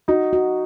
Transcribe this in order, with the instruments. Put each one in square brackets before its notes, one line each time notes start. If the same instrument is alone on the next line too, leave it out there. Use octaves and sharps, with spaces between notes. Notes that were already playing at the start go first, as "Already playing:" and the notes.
[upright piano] D#4 [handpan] F#4
[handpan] F#4